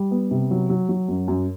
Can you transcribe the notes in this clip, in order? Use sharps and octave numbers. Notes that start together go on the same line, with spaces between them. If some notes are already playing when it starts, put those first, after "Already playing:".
Already playing: G3
B3
C3
F#3
F#3
F#3
F#2
F#2